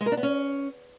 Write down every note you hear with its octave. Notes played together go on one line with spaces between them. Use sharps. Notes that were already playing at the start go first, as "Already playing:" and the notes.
G#3
A#4
D4
B3
C#4